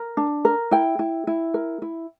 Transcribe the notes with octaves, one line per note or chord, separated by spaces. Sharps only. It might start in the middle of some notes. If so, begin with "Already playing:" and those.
Already playing: A#4
D4
A#4
E4 G5
E4
E4
A#4
E4